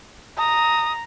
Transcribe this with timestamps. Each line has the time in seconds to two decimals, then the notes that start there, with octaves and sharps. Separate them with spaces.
0.38 A#5 D#6